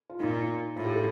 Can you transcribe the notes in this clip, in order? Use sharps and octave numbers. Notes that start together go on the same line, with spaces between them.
F4
A#2 D#4
A2 F4
G4
A4